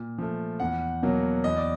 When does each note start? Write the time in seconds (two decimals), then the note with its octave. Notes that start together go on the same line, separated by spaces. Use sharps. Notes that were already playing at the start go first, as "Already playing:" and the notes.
Already playing: A#2
0.18 F3 A3
0.60 E2 F#5
1.03 B2 F#3 A#3
1.44 E2 D#5
1.57 D5